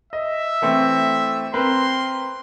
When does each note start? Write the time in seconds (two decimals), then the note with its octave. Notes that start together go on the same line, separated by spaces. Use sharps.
0.13 D#5 E5
0.62 E3 A3 C4
1.54 C4 A#4 B4 C6